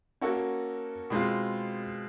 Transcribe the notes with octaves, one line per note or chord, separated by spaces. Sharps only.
A#3 C#4 F#4 A4
B2 G#3 C4 F4